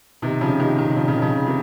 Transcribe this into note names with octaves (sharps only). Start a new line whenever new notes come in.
C3 D#3
C#3 F3
C3 D#3
C3 D#3
C#3 F3
C#3
D#3
C#3 F3
C3 D#3